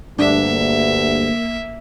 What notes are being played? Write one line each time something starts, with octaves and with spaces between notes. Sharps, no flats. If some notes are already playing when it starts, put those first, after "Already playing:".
D2 G2 A#3 D4 E5